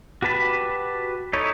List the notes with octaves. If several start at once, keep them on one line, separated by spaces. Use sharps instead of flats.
F#4 G4 B4 A5 B5
D#4 E4 A4 C#5